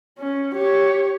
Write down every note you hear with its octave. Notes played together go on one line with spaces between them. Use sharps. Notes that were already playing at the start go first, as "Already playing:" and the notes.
C#4
G4 C#5